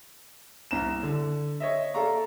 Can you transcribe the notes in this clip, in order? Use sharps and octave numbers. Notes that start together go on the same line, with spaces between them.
C2 A#5 E7
D3
C#5 D#5 E5
A4 D5 F5 A#5 C#6